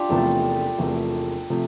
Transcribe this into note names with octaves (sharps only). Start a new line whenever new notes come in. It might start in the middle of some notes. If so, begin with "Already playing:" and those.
Already playing: D4 F4 G4
E1 E2 C3 F3 A3 A4
E1 E2 C3 F3 A3
C3 F3 A3